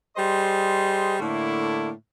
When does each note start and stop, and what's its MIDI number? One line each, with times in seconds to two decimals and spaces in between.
0.17 1.15 55
0.17 1.15 68
0.17 1.15 72
0.17 1.15 75
0.17 1.15 84
1.20 1.90 45
1.20 1.90 50
1.20 1.90 57
1.20 1.90 58
1.20 1.90 64